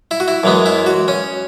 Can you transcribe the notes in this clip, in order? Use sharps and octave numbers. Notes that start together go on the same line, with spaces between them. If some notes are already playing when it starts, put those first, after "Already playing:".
E4
F#4
E4
F#2 E3 G#3 B3
E4
F#4
C#4